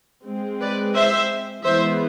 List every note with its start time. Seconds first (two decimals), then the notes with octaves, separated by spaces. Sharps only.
0.25 G#3 C4
0.60 B4 D5
0.95 C5 E5
1.64 E3 G#3 B3 C5 E5